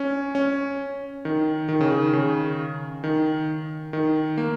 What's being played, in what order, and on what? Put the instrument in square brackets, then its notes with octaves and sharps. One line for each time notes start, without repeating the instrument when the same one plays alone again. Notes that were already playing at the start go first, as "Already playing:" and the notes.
Already playing: [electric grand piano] C#4
C#4
D#3
D#3
C#3
D#3
C#3
D#3
D#3
A#3